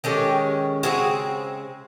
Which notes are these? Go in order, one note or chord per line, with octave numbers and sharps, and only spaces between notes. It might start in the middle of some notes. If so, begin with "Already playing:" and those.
D#3 G#3 C#4 G4 A4
C#3 E3 G#3 C4 F#4 G#4